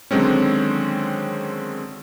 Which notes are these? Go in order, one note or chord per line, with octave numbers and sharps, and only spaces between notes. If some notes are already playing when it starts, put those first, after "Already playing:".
D3 D#3 F#3 G#3 C4 C#4